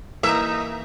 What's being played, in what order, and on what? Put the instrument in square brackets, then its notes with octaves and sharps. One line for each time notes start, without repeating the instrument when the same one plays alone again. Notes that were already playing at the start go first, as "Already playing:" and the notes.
[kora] E3 A#3 [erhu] D#4 [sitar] E5